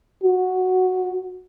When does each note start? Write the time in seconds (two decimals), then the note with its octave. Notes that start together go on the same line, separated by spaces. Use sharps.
0.23 F#4